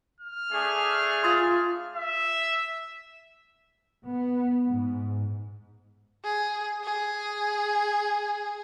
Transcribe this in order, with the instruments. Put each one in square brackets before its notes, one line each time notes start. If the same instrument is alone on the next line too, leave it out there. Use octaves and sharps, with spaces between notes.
[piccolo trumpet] F6
[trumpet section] A3 D4 G#4
[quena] F4 [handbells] C6 D#6 A6
[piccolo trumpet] E5
[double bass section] B3
G#2
[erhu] G#4
G#4